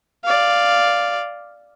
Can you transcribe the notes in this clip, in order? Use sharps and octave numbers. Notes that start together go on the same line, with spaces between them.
D5 F5